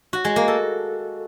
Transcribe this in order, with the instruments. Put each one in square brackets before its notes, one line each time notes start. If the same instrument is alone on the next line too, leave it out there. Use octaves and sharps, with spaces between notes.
[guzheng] F#4
G#3
A#3
A4